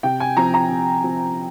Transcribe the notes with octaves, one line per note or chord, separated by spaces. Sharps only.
C3 G5
G#5
F3 C4 A#5
A#5
C3
F3 C4